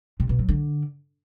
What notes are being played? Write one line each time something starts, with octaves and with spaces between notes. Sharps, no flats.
C3
B2
F#3
D3